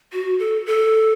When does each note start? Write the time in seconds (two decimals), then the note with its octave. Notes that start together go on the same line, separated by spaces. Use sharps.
0.13 F#4
0.39 A4
0.66 A4